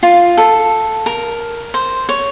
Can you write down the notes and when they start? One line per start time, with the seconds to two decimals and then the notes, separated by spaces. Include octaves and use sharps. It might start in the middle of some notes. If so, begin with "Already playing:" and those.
0.03 F4
0.37 A4
1.06 A#4
1.74 C5
2.09 C#5